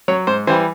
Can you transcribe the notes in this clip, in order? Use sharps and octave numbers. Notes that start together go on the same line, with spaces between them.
F#3 C#5
G#2 C5
E3 G3 C5